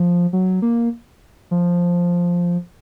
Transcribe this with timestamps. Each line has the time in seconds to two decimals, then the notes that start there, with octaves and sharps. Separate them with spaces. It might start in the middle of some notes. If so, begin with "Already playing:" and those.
Already playing: F3
0.33 F#3
0.62 A#3
1.51 F3